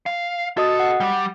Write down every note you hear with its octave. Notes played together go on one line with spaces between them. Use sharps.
F5
F#4 A4 D#5 D#6
F#5
G3 G4